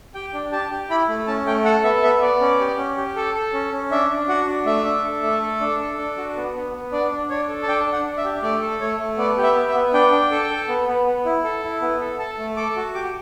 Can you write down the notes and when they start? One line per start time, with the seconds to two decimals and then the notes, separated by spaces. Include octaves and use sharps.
0.15 G4 G5
0.34 D4
0.52 G4 A5
0.71 G4
0.90 E4 B5
1.09 A3
1.27 C#4 A5
1.46 A3 G5
1.65 A4 F#5
1.84 B3 E5
2.03 B3 E5
2.21 B3 D5
2.40 C#4
2.60 G4
2.78 C#4
2.97 G4
3.16 A4
3.35 A4
3.53 C#4
3.72 C#4
3.91 D4 E5
4.10 D4
4.28 F#4 F#5
4.47 D4
4.66 A3 E5
4.85 D4
5.04 A4
5.23 A3
5.42 A4
5.61 D4
5.79 A4
5.98 D4
6.17 F#4
6.36 B3
6.55 B3
6.73 B3
6.92 D4 D5
7.12 D4
7.30 D4 C#5
7.48 A4
7.63 A5
7.68 D4 G5
7.86 D4
7.93 F#5
8.05 D4
8.18 E5
8.25 G4
8.42 A3 D5
8.62 A4
8.81 A3 C#5
9.00 A3
9.18 B3 D5
9.37 G4
9.43 E5
9.55 B3
9.68 E5
9.75 B3
9.94 D4 G5
10.12 D4
10.31 A4
10.50 A4
10.68 B3
10.87 B3
11.07 B3
11.25 E4
11.44 A4
11.63 E4
11.81 B3
12.00 A4
12.19 A4 A5
12.38 A3
12.57 A4 D6
12.76 F#4
12.94 G4 D6